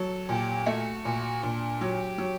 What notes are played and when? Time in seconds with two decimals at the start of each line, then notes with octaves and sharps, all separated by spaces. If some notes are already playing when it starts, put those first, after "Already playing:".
Already playing: F#3 A4
0.29 A#2 G4
0.66 A3 F#4
1.05 A#2 F#4
1.42 A#2 D4
1.81 F#3 G4
2.18 F#3